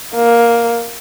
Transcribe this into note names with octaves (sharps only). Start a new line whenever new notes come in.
A#3